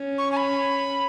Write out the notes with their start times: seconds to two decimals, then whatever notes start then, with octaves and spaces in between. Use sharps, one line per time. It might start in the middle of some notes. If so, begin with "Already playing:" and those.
Already playing: C#4
0.18 C#6
0.32 G#5
0.37 B5